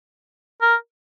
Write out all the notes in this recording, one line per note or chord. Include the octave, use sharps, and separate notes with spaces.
A#4